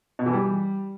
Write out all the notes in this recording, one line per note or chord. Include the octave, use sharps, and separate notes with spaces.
B2
E3
G3